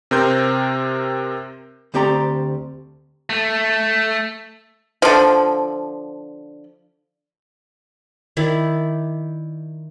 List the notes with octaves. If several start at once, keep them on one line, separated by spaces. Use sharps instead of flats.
C3 C4 A#4 C6 G6
D2 C4 G4 D5 A#5
A3
D3 F3
D#3 E4 D5